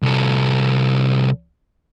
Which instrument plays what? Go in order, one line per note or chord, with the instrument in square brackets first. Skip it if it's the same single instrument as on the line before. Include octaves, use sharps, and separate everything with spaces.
[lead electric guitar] C2 A4